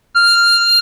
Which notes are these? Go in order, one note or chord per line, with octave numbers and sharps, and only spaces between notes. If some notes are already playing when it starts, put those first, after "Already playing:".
F6